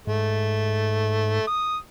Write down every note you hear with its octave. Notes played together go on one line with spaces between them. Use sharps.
G#2 A3
D#6